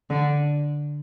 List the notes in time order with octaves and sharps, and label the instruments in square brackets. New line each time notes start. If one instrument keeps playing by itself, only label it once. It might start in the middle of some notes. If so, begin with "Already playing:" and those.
[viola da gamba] D3